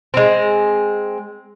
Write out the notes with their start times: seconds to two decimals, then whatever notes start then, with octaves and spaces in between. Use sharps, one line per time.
0.14 G#3 C4